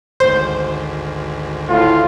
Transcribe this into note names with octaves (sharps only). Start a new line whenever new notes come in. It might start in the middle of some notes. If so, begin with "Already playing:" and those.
G#1 D2 G#2 C5
A2 F4